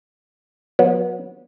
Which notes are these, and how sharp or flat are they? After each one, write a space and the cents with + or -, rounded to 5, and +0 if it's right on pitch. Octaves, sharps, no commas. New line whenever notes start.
F#3 -35 B3 -25